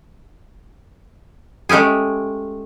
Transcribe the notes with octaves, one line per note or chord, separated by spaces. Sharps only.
G#3 A3 C#4 G4 G#4